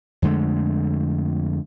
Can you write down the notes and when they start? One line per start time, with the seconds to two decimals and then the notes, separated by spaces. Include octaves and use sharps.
0.22 F2 D3 G#3 A3